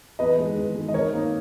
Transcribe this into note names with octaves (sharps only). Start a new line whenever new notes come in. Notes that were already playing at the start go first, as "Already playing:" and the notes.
E2 B4 D#5
D#3 G#3
E2
D#3 G#3
D#5
D#3 A#4 C#5
A#3 D#4